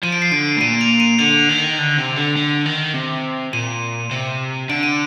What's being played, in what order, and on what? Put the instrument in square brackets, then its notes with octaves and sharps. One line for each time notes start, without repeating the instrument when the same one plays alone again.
[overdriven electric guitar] F3 [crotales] D#7
[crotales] D7
C7
[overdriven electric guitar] D3 [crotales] D7
[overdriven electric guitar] A2
[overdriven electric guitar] A#2 [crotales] D#7
[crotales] F7
D#7
[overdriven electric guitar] D3 [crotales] F7
[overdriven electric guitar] D#3
D3
C3
D3
D3
D#3
C3
[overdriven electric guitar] A#2 [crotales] D#7
[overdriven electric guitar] C3
[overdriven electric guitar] D3 [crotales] D7
[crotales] D#7